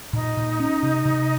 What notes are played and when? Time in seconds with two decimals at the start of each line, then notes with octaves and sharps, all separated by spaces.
0.13 A#2 D#4
0.37 A#2
0.60 C#4
0.83 C3
1.05 C3